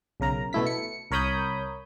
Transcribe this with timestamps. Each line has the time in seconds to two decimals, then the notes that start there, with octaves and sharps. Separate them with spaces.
0.20 B1 C#3 A#4 A#5
0.53 B2 A3 E4 B6
0.67 C#7
1.11 C2 A#4 C#5 B5 D#6 G6